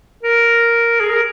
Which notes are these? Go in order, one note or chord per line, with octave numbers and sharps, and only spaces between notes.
A#4
G#4
A#4